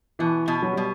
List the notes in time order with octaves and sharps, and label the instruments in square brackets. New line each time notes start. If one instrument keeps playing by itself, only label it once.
[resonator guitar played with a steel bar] B2 [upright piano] E3
[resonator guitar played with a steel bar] B2
[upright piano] F#3
[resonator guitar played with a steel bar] B2 [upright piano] G3